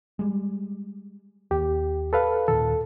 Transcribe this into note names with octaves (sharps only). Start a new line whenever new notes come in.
G3 G#3
D#2 G4
A4 B4 F5
D#2 A#2 D#3 A4